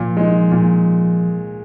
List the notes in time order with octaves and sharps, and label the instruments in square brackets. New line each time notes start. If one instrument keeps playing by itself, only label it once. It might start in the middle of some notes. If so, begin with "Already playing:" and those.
Already playing: [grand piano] A#2 [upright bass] F3
[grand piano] G#3 D#4
A#2